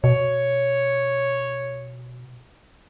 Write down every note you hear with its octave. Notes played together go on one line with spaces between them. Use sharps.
B2 C#5